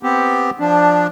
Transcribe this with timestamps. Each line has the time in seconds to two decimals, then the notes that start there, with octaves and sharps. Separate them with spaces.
0.03 B3 C4 G4
0.59 F3 D4